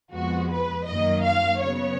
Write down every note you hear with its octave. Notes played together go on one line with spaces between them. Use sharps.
F2 F3 G#3 B3 F#4
B4
F#2 D#3 F#3 A#3 D#5
F5
C#3 F#3 B3 C#5